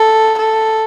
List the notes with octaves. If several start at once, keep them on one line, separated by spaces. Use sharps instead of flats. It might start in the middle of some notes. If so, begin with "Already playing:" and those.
Already playing: A4
A4